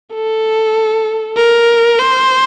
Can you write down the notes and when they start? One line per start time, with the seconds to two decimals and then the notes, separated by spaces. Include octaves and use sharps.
0.14 A4
1.37 A#4
1.99 C5